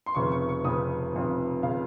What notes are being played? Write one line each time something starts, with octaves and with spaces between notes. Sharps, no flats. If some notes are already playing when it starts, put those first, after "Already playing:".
C6
F1 F2 C#3 C#6
C#6
C#6
F1 F2 C#3 D#6
F1 F2 C#3
C#3 F5